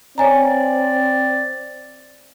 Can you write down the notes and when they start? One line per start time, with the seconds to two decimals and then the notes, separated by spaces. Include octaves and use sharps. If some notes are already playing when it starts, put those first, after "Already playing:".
0.18 C4 C#5 D5 G#5 A#5